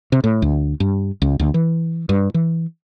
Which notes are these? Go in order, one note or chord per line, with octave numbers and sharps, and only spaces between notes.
C3
A2
D2
G2
C#2
D2
E3
G2
E3